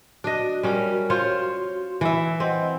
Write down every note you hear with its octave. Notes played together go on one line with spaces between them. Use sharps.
D4 F#4 D#5
G3 C#4 F#4 A#4 C#5
F4 F#4 C5 C#5 C6
E3 E5
C4 D#5 F#5